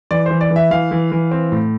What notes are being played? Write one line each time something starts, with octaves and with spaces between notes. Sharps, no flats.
E3 D5
E3 C5
D5
E3
E5
E3 F5
E3
E3
C4
A2